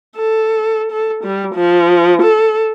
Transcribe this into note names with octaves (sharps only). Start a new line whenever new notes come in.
A4
A4
G3
F3
A4